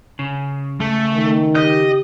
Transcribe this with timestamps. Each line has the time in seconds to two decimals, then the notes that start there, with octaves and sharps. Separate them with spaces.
0.19 C#3
0.80 A3
1.13 D#3
1.55 G4 D#5 G6